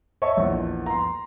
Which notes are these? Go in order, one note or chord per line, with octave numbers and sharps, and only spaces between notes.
C#5 D#5 E5 A5 C#6
A#1 E2
A#5 C6